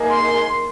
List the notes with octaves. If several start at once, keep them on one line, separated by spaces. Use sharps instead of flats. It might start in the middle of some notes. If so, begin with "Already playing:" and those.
Already playing: A#3 D#4 G#4
C6